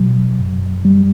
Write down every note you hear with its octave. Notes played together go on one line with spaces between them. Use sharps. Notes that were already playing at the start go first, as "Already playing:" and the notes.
Already playing: B2 F#3
F#2
G3